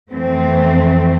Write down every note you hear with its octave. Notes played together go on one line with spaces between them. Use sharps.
F2 E3 A3 C4